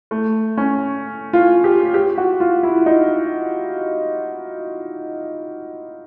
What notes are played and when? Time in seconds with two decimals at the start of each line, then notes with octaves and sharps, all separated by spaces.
0.11 A3
0.57 C#4
1.33 F4
1.64 G4
1.94 G4
2.18 F#4
2.40 F4
2.63 E4
2.86 D#4